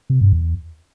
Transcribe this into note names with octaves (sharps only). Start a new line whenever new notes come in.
C3
G2
E2